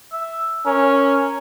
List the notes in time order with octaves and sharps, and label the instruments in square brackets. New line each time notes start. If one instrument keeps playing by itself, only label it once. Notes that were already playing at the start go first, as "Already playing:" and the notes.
[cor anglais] E5
[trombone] C#4 [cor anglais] A#4